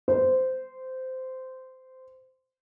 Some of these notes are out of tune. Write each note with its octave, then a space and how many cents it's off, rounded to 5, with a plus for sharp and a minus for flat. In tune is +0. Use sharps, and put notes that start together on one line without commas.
C5 -15